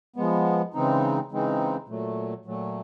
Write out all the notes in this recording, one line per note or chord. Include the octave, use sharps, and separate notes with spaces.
F3 G#3 B3
C#3 E3 G#3 C4 D#4
C#3 E3 G#3 C4 D#4
A#2 F#3 A3
A#2 F#3 A3